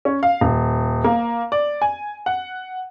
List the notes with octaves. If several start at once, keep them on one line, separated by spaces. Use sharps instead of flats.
C#4
F5
D#1
A#3
D5
G#5
F#5